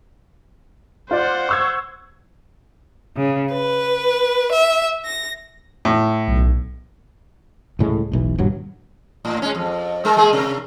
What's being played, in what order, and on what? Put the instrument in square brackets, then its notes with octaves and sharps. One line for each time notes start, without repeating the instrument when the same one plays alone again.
[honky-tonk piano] F4 D5 [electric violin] C5 F#5
[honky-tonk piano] C#6 E6 G#6
[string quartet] C#3
B4
E5
A#6
[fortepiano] A2
[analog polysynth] B1
[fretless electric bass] C#2 A2 G3 G#3
E1 B1 E3
D#1 G2 F#3
[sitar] A2
G#3 C#4
F2
G#3 A#4
G#3 A#3 G#4
C3 A#4